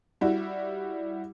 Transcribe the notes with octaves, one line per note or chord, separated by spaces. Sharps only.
G3 E4 F#4